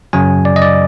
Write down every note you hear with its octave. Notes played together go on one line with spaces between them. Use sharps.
F#2 C#3 F#3 G#5
D5
D#5
D5